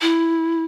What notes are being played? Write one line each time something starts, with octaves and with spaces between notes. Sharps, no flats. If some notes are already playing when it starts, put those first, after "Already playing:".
E4